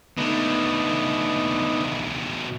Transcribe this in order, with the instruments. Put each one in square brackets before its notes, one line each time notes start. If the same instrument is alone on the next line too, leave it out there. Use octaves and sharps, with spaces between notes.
[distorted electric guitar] B2 A3 [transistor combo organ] D3 B3 D#4